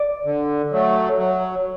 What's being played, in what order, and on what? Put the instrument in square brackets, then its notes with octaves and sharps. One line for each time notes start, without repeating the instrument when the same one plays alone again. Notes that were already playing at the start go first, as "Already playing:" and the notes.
Already playing: [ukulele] D5
[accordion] D3
F#3 A3
F#3